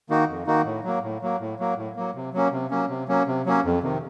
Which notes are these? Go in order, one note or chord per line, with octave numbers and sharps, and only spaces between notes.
D#3 A#3 D#4 F#4
F2
D#3 A#3 D#4 F#4
A2
F#3 A#3
A2
F#3 A#3
A2
F#3 A#3
A2
F#3 A#3
C3
F#3 A#3 C#4
C3
F#3 A#3 C#4
C3
F#3 A#3 C#4
C3
F#3 A#3 C#4
F2
C3 D#3